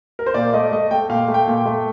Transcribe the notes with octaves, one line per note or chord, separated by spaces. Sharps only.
A#4
C5
A#2 D5
A3 D#5
A3 D#5
A3 G5
A#2 F5
A3
G5
A#2
A3